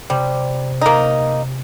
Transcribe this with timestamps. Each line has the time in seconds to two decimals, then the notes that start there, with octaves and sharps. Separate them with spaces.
0.10 C3 G3
0.81 A#3 D#4